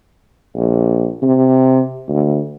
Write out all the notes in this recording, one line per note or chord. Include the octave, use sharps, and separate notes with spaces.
A#1
C3
D2